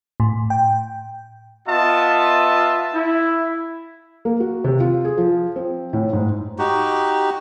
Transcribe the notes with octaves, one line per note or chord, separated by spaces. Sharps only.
A2
G5
B3 F4 D#5 E5 A5
E4
A#3
F#4
C3
F4
G#4
F3
C4
A2
G#2
D#4 F#4 G4